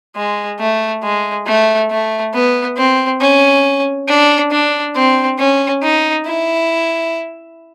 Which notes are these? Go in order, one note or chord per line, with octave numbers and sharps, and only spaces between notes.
G#3
A3
G#3
A3
A3
B3
C4
C#4
D4
D4
C4
C#4
D#4
E4